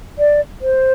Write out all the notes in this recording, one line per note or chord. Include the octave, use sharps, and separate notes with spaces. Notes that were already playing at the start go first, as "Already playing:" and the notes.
D5
C5